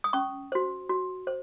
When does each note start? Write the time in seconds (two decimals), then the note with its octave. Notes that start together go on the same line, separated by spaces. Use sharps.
0.04 D#6
0.13 C#4 C#6
0.52 F#4 C5
0.89 F#4
1.27 C5